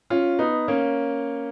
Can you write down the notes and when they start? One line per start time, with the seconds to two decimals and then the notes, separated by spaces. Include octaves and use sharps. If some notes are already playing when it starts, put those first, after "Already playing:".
0.10 C#4 F4
0.39 B3 D#4
0.68 A#3 C#4